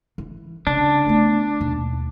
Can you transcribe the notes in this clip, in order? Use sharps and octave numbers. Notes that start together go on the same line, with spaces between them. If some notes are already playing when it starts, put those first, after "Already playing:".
E3
C#3 D4
A3 B3
D#2 B2